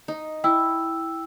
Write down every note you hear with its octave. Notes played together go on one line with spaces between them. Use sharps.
D#4
E4 G5 E6